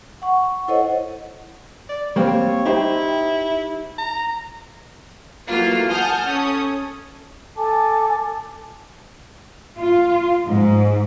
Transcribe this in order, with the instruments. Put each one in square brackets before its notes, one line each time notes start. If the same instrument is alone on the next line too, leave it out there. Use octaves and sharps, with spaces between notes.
[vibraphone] F#5 C#6
E4 A4 C5 C#5 D#5 F#5
[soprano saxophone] D5
[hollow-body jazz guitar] G3 A#3 C4 [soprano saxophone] C#5
[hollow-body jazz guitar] D#4 G4 C5 [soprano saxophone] E4
[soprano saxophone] A#5
[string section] E3 F#3 A3 A#3 F4
F#5 G#5 A5 D#6 F6 G6
C#4 A4 D#6
[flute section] A4 G#5 A5 D6
[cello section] F4
G#2